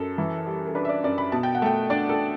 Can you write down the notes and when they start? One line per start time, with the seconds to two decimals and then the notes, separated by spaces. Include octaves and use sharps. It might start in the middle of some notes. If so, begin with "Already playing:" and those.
Already playing: F#2 A4
0.18 E3
0.46 G3
0.67 A4
0.75 D4 B4
0.85 E5
0.89 D5
1.04 F#2 D5
1.18 B5
1.32 B2 A5
1.43 G5
1.55 F#5
1.62 A3 G5
1.90 D4 D5
2.09 A4